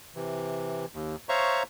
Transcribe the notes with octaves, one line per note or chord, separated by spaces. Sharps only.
C3 E3
D#2
C5 C#5 E5 F5 A#5 C#6